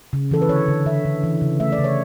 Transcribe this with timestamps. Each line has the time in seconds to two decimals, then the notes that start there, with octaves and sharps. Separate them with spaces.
0.13 C#3
0.31 E3 A4
0.42 B4
0.49 D3 C#5
0.68 D3
0.86 D3 E5
1.05 D3
1.23 E3
1.41 C#3
1.60 A3 E5
1.72 D5
1.78 C#3
1.84 C#5